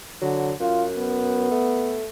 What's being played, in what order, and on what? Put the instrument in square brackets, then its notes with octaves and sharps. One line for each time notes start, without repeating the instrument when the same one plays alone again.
[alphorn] D3 [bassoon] F#3
[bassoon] F#2 [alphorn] F4
[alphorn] B3
[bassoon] A3